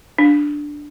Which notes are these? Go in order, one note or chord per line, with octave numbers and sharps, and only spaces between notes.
D4